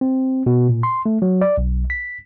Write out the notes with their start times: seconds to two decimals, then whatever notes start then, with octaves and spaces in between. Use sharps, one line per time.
0.01 C4
0.46 B2
0.69 A#2
0.83 C6
1.06 A3
1.22 F#3
1.41 D5
1.58 B1
1.90 B6